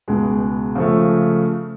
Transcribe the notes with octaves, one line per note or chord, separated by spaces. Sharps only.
C#2 B2 G#3
C#3 F3 A3